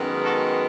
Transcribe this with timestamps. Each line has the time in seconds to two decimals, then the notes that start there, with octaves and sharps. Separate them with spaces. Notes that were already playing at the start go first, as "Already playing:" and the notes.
Already playing: F#2 D#3 G#3 B3
0.24 F#4 A4